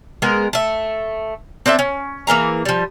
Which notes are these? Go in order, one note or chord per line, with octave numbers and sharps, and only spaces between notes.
G#3 B3 A#4
A3 E5
C4 D4 A4 E5
C#4
E3 A#3 G#4 A#5
F3 G3